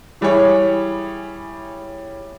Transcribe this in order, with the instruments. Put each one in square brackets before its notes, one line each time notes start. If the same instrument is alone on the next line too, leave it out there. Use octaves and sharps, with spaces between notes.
[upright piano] E3 G3 E4 G#4 C#5